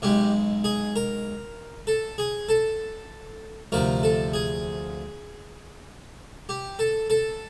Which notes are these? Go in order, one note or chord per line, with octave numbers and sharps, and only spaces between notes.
B1 B2 G#3 G4
G#4
A#4
A4
G#4
A4
D2 C3 F3 A#4
A4
G#4
G4
A4
A4